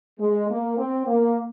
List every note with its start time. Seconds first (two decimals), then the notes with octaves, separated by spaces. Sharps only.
0.20 G#3
0.50 A#3
0.78 C4
1.07 A#3